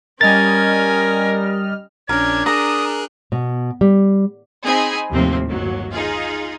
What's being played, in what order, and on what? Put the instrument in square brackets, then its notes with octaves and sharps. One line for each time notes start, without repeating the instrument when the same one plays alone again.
[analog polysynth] G3 D#5 F6 [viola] C#4 G#5 [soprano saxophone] A#4 [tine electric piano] A6
[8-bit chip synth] A#1 C#4 [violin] D4 [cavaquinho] A#4 [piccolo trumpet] G#6
[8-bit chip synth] G#4 A#4 F#6 [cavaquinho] A#5 [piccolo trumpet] D#6
[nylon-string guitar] B2
G3
[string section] C4 D#4 G#4 D#5 G#5 B5
D#2 A2 C3 F3 A#3 C4
G1 D#2 F#3
D#4 F4 G#4